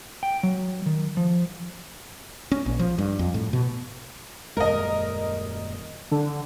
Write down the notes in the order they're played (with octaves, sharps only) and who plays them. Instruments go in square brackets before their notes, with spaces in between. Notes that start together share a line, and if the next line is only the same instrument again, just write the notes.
[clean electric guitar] G5
F#3
D#3
F3
[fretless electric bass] C#4
A#1
F3
G2
F2
A2
B2
[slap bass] D#1 F#2 G#3 [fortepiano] A#4 D#5
[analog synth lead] D3